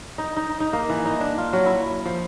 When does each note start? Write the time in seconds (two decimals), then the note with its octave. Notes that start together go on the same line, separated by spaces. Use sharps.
0.18 D#4
0.36 D#4
0.60 D#4
0.73 A#3
0.90 E3
1.05 D#4
1.20 D4
1.38 F4
1.53 F#3
1.66 E4
2.06 F3